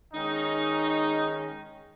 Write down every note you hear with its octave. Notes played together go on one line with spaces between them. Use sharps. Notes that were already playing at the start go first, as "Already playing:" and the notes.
D#3 G#3 C#4 D#4